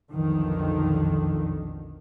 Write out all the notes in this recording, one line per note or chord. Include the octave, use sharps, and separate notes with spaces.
B1 F2 D3 D#3